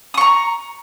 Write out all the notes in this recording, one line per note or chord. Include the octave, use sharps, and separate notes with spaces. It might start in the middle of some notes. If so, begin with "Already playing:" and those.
A#5 C#6 D#6